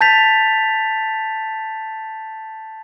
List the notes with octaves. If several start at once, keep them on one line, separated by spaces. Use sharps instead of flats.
A5 G6 A6 B6 F7